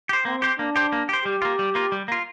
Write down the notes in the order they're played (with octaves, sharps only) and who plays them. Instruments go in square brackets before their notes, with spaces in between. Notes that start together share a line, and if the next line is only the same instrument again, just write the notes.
[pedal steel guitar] G4 C5
[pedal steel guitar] A#3 [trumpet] C4
[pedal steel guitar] G4 C5
[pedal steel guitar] A#3 [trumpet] D4
[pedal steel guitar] G4 C5
A#3
G4 C5
[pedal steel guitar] G3 [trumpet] G4
[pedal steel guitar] A#3 F4
G3
A#3 F4
G3
A#3 F4